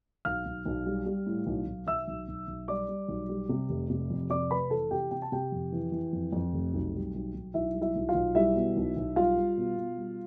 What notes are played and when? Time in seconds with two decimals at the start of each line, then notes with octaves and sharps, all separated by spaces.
0.25 B1 F5 F6
0.46 B1
0.65 B1
0.86 G3
1.06 G3
1.26 A2
1.46 B1
1.67 B1
1.87 B1 E5 E6
2.08 B1
2.28 B1
2.48 B1
2.68 G3 D5 D6
2.89 G3
3.08 B1
3.29 G3
3.49 C3
3.69 F1
3.90 C3
4.10 F2
4.30 C3 D5 D6
4.50 F1 B4 B5
4.70 E3 A4 A5
4.91 C3 G4 G5
5.11 C3 G5
5.22 A5
5.32 C3 G4 G5
5.52 F2
5.72 E3
5.92 E3
6.13 F2
6.33 F2
6.53 F1
6.74 B1
6.94 G3
7.14 B1
7.35 B1
7.54 B1 E4 E5
7.74 G3
7.81 E4 E5
7.95 B1
8.09 F4 F5
8.15 B1
8.35 G3 E4 E5
8.55 B2
8.76 B1
8.96 B1
9.16 G3 F4 F5
9.37 G3
9.57 B2
9.77 B2
9.97 G3